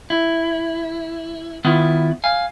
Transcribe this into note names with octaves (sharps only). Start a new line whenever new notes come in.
E4
D#3 B3 E4 F4
F5 G#5